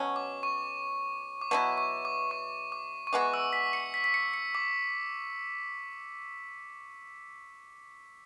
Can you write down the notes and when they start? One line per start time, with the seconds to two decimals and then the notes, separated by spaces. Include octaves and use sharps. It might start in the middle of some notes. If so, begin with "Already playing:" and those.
Already playing: B2 F#3 C#4
0.16 D6
0.43 C#6
1.41 D6
1.51 B2 F#3 B3 E4 C#6
1.78 C#6
2.05 D6
2.31 C#6
2.72 D6
3.07 C#6
3.13 E3 G#3 B3 F#4 D6
3.34 E6
3.53 B6
3.73 C#7
3.94 B6
4.04 B6
4.14 C#7
4.34 C#7
4.55 D6